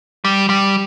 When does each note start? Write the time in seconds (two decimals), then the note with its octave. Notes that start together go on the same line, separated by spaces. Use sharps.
0.25 G3
0.49 G3